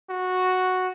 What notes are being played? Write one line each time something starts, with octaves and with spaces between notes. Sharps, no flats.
F#4